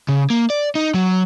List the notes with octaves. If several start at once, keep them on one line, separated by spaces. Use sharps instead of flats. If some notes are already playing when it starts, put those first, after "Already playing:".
C#3
A#3
D5
D#4
F#3